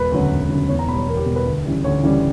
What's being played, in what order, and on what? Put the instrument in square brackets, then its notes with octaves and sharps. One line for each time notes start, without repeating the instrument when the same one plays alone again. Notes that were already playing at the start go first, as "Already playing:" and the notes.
Already playing: [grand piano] E1 B4
D2 C#3 F#3
E1
D2 C#3 F#3
E2 C#5
A#5
B2 B5
G3
C#5
E2 A#4
G4
B2 G3
B4
D2
C#3 E3 G3
D2 C#5
C#3 E3 G3